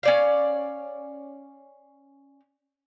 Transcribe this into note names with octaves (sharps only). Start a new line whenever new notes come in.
C#4 D5 F5